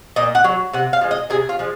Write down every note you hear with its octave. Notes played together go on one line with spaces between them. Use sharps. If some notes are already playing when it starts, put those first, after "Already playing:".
A#2 D#5
F#5
F#3
C3 F#5
F5
F3 G#3
D#5
C3 G#4
F4
F3 G#3